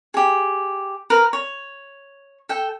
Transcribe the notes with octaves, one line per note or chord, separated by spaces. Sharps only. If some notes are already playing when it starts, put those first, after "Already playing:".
G4 G#4
A#4 B4
C#5
A4 G5